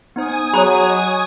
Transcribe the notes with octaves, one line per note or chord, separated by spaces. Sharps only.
B3 D#4 C5 G#5 D#6
F#3 G#4 C#5 A#5 B5 C#6 F#6
D#5 C#6